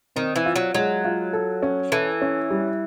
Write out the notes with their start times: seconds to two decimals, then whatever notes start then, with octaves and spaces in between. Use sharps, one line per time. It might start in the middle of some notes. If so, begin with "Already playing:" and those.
0.16 D#3 C4
0.36 E3
0.46 F4
0.56 F#3
0.75 F#3 G#3
1.04 F4
1.33 A4
1.63 C#4
1.92 E3 A4
2.22 C#4
2.51 G3